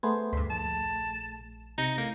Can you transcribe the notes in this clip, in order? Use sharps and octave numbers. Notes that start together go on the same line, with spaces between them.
A3 B3 G#4 C5 G#6
D2 G2 C6 B6
A#1 A5
C3 D#4 G6 A#6 C#7
A2 A#3